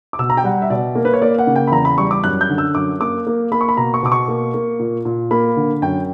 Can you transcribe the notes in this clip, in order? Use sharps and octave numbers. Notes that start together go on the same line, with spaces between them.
D6
B2 E6
A#5
G5
G3 F#5
E5
B2 D5
A#3
B4
C#5
A#3 D5
F#5
C#3
G5
B5
E2 A#5
B5
G3 C#6
D6
F#2 F#6
G6
D3
E6
F#2 D6
A#3 D6
A#3
A#3 B5
C#6
B5
B2 A#5
C#6
B2 D6
C#6
A#3
A#3
A#2
A#2
A#3 B5
D3
F#2 G5